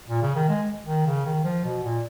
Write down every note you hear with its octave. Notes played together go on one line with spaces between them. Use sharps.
A#2
C#3
D#3
G#3
D#3
C#3
D#3
F3
B2
A#2